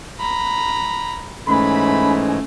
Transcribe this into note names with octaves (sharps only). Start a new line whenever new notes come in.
A#5 B5
G#2 E3 G#3 A3 C#4 B5